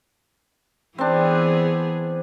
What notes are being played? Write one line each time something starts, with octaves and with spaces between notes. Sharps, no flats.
E3 B3 C4 D4 G#4